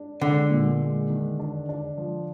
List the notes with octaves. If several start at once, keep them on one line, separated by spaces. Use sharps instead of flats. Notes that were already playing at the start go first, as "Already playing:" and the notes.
Already playing: D4
D3 G#3
A#2
G#3
D#3
D4
D4
F3